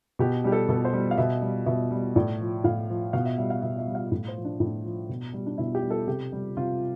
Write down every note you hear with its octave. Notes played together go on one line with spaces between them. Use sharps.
B2 G4
G3 G4
A4
B2 A4
C5
G3
F5
B2 E5
G3
B2 E5
G3
A2 D5
F3
A2 F5
F3
B2 F5
E5
G3 E5
F5
B2 E5
E5
G3
F5
A2
C5
F3
D4
A2
D4
F3
B2
G3
D4
B2 E4
G4
G3
A4
C3 G4
G3
C3 F4